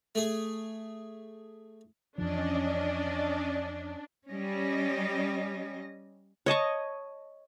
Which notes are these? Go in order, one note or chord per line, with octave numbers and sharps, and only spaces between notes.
A3 G#4
F2 E3 F3 C#4 D4 D5 D#5
G3 C#4 D#5
C#5 D#5 A5 C#6